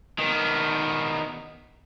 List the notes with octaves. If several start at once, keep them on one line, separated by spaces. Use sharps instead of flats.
D#3 B3